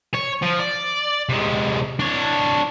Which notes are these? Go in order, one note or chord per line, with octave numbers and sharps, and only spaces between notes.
C#5
F3
D5
C3 G#3
D4 C#5